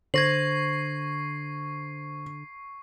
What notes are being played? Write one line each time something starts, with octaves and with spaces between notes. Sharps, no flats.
D3 C5 C#6 G#6 A#6 C7 F#7